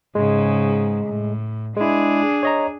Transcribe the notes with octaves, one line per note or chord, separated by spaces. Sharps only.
G#2 C#3 G#3
A2
G#3 D4 E4 G#4
C#5 D#5 A#5